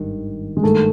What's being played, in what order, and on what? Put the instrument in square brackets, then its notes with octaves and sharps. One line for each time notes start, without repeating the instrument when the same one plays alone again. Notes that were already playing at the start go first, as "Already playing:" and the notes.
Already playing: [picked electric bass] G#1 G2 D#3
[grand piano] G#3
[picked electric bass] G#1 G2 D#3 [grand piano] A3